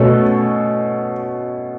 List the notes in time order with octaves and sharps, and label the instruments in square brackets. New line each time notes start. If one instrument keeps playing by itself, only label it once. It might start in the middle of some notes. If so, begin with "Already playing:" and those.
Already playing: [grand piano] B2 A3 C#4 A4